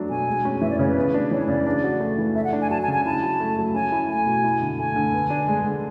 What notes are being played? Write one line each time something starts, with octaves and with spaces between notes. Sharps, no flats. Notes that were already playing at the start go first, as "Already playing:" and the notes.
Already playing: F#3 A3 D4
B2 G#5
G#3
C#4
E3 E5
D5
C#3 C#5
B4
B3
D4
E3 C#5
C#3 D5
D4
F#4
A3
E3
A3 E5
F#5
D4
G#5
F#3 A5
G#5
C#3
G#5
E4 A5
F#3
A3
F#3
C#4 G#5
E4
A3 G#5
B2
E4
D3
A3 G#5
D3
B3
D4
G#3
D3